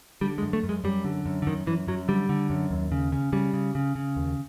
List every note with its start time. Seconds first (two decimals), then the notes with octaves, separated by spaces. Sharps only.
0.21 D3 G3
0.38 G#3
0.42 F#2
0.53 A3
0.64 F#2
0.69 G#3
0.84 F#2 G3
1.04 D3
1.26 F#2
1.42 D3
1.47 F#2 D#3
1.67 F#2 E3
1.88 F#2 F#3
2.08 D3 G3
2.29 D3
2.50 F#2
2.71 D#2
2.92 C#3
3.12 C#3
3.33 C#3 G3
3.54 C#3
3.75 C#3
3.95 C#3
4.16 D#2